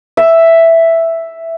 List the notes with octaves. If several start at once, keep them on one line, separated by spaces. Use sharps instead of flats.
E5